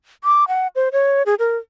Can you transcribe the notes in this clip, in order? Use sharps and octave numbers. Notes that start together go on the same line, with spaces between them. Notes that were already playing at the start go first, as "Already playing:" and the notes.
D6
F#5
C5
C#5
G#4
A#4